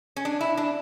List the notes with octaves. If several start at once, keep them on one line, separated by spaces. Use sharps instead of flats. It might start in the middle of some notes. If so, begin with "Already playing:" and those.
C#4
D4
E4
D4